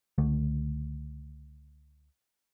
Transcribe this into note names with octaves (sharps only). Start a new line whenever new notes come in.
C#2 D3 A3